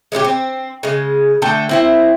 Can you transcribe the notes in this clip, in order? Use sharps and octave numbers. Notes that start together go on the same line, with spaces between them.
G#3 C#4 F4 G4
C4
C#3 G#3
D3 A3 A4 G5
C4 E4 C5